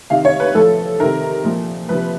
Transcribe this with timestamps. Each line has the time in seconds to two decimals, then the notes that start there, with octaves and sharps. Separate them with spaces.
0.10 C3 D#3 F5
0.25 C#5
0.40 B4
0.55 A2 F3 A4
1.00 C3 D#3 A#4
1.44 A#2 F3
1.89 C3 F3 B4